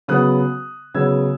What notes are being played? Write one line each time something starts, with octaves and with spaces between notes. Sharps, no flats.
C#3 F#3 B3 D#6 F#6
C#3 F#3 B3 E6 G#6